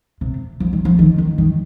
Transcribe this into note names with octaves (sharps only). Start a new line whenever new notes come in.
C3
F3
D#3
F3
D#3
D#3
D#3